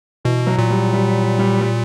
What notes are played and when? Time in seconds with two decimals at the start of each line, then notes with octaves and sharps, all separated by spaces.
0.25 B2 E3
0.47 F#3
0.58 A#2
0.70 G3
0.93 G3
1.39 G3
1.61 G3